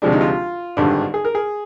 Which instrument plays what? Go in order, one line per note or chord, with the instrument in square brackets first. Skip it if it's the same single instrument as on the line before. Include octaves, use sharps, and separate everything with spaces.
[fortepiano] D2 C3 F3 G#3 D4
D#4
F4
G#1 G2 D3 G3
G#4
A#4
G#4